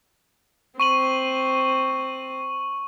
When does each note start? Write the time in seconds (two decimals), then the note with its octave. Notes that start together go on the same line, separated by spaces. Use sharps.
0.80 C4 C#6 D#7 F#7